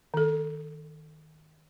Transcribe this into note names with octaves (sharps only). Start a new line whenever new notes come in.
D#3 A4